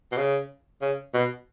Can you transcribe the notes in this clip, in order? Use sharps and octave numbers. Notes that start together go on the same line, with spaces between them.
B2
C#3
C#3
B2